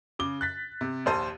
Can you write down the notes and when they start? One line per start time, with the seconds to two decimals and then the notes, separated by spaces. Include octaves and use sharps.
0.19 C#3 D6 G7
0.41 F#6 A6 B6
0.81 C3
1.05 A#1 D#2 C5 A5 D#7